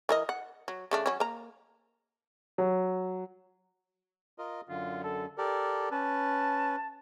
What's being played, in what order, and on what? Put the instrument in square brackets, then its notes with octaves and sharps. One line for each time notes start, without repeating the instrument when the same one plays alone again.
[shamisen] E3 A#4 D#5
F#5
F#3
C#3 A3 D4
F#3 C#4
A#3 A#5
[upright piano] F#3
[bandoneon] F4 A#4 D#5
[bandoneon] F#2 D3 [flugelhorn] F4
[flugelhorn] A4
[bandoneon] G4 A#4 D5 [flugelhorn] A4
[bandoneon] C#4 B4 [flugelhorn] A5